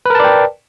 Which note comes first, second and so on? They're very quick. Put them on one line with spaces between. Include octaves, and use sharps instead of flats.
B4 A#4 A5 D5 G5